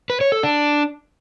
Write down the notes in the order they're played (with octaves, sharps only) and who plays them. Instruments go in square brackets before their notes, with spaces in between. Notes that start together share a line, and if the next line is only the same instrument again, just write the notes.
[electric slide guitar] B4
C#5
A4
D4